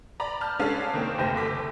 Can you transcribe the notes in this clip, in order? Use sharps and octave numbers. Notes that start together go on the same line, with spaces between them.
D5 A#5 B5
A5 F6 G6
G#3 C#4 D4 A4 D5 F5
D#3 A#3 C4
F1 D2 G4 C5 A#6
F#1 A3 D6 B6